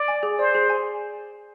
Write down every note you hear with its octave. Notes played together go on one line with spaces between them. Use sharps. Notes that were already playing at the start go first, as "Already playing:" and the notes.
Already playing: D5
G#5
G#4
C5 D5
G#4
G#5